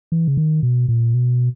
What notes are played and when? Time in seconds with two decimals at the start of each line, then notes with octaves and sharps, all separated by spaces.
0.12 E3
0.28 C#3
0.37 D#3
0.63 B2
0.89 A#2
1.14 B2